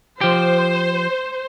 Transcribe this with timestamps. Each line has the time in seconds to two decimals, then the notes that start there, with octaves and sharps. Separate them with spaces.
0.21 F3 G4 C5